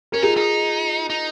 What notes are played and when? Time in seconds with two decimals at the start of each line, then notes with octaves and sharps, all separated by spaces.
0.12 C#4 A#4
0.22 D#4 F4 G#4
0.37 D#4
1.10 D#4